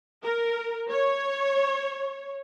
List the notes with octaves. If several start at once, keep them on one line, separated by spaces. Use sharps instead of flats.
A#4
C#5